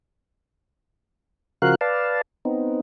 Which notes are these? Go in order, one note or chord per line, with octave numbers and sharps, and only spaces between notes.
C#3 F3 F#4 A#4 F5 F#6
B4 D5 F5 A5
B3 C4 D#4